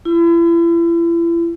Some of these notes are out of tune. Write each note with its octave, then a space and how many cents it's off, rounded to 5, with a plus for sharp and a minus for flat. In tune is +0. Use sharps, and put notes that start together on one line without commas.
E4 +40